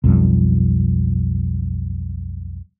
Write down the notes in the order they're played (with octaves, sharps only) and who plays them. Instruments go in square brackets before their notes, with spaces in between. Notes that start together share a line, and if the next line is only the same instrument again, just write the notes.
[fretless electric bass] B1 F2 G3